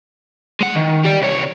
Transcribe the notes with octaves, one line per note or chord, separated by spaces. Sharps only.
G#3 F#5
D#3
G4 D5
C2 C#5